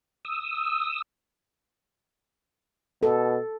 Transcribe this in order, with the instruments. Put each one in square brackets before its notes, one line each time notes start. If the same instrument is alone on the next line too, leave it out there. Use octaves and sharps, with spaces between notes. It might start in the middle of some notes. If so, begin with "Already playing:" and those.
[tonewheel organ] D#6 E6
[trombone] B2 [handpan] A4